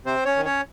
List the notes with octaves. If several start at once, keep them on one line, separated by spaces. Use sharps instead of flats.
C3 C4 C5
C#4 C#5
D#3
C#4 C#5